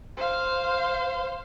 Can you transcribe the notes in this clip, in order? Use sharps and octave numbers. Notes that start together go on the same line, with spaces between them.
C5 F5